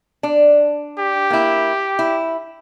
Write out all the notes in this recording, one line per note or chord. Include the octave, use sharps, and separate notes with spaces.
D4
G4
A#3 E4
E4